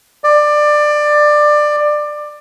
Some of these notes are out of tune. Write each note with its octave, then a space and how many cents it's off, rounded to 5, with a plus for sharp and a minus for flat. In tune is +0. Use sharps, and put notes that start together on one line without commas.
D5 +20